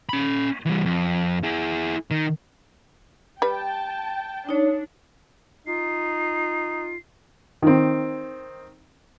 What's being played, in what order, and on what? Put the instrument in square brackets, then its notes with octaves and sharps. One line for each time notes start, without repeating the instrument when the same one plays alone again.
[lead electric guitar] C#4 B5
E3 G3
F2
E4 G#4
D#3
[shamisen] G3 B4 [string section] G5 A5
[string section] D4 [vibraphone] D#4 C#5
[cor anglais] D#4 [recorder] F4 [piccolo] C7
[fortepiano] D#3 C4